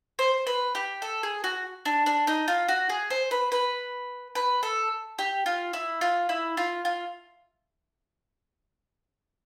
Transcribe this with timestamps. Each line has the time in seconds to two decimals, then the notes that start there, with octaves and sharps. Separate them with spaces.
0.19 C5
0.47 B4
0.75 G4
1.02 A4
1.23 G#4
1.44 F#4
1.85 D4
2.06 D4
2.27 D#4
2.48 F4
2.68 F#4
2.89 G#4
3.10 C5
3.31 B4
3.52 B4
4.35 B4
4.63 A4
5.19 G4
5.46 F4
5.73 E4
6.01 F4
6.29 E4
6.57 F4
6.85 F4